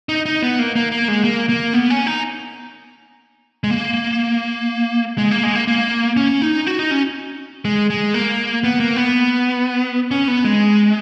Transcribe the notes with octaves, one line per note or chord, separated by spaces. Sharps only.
D#4
D#4
B3
A#3
A#3
A#3
G#3
A#3
A#3
B3
C#4
D#4
G#3
A#3
G#3
A#3
G#3
A#3
A#3
C#4
D#4
F#4
D#4
C#4
G#3
G#3
A#3
B3
A#3
B3
C#4
B3
G#3